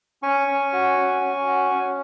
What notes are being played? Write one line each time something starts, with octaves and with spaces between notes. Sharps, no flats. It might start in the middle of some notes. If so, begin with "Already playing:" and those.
C#4 G#5 C#6
C#4
F#4
C#4
C#4
F#4
C#4